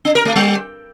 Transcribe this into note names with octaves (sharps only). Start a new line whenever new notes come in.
D4
A#4
A3
G3